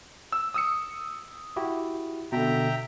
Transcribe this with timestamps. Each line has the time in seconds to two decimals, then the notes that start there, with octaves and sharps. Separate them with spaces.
0.32 E6
0.54 D#6 E6 C#7
1.56 E4 F#4 G4
2.32 B2 D3 E5 G5 A#5